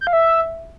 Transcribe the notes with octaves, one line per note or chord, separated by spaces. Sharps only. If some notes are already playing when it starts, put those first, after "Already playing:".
G6
F5
E5